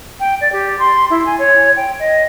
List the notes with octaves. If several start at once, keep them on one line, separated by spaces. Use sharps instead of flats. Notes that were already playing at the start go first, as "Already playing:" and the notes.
G5
D5
G4
C6
E4
G#5
C#5
G5
D#5